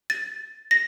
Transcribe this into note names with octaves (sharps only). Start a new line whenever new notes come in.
A6
A#6